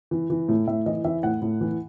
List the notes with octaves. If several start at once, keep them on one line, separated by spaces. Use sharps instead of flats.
E3
E3
A2
A2 E5
E3 D#5
E3 E5
A2 F#5
A2
E3